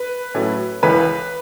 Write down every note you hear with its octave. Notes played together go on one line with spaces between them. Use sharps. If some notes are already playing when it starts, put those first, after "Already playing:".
Already playing: B4
A2 F#3 A3 C#4
C#2 C#3 E3 C#4 B4